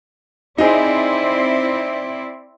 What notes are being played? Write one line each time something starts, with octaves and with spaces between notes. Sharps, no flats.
C4 D#4 E4 G#4 D5